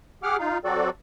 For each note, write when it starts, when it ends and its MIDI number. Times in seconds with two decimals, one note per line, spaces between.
0.23 0.37 67
0.23 0.37 68
0.23 0.37 78
0.23 0.37 86
0.23 0.37 89
0.39 0.58 63
0.39 0.58 65
0.39 0.58 77
0.64 0.90 54
0.64 0.90 60
0.64 0.90 66
0.64 0.90 69
0.64 0.90 74